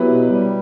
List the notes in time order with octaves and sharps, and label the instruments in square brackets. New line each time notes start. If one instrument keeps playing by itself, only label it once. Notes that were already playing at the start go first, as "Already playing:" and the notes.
Already playing: [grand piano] F#3 B3 E4 G4 B4
[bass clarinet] B2
G3